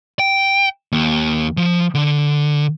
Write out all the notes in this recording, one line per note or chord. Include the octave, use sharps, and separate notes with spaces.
G5
D#2
F3
D3